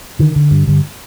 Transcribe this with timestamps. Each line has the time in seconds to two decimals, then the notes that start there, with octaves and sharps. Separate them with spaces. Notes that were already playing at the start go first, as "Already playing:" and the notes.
0.19 D3 D#3
0.36 D3
0.51 G2
0.67 G2 D3